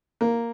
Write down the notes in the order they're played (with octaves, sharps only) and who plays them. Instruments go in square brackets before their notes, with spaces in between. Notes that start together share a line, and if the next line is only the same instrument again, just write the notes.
[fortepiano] A#3